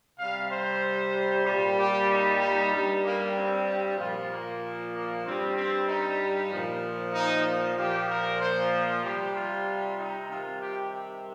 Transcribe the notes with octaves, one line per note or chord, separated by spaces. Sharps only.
C3 G3 F5
C5
A#2 G3
G4
D#4
D#4
G2 G3
A#3
C4
A#2 F3 F4
A#3
A#3
G2 G3 C4
C4
D#4
A#2 F3
D#4
A#2 F3 G4
A#4
C5
C3 G3 G4
F4
D#4
C3 D#3 G3 F4
G4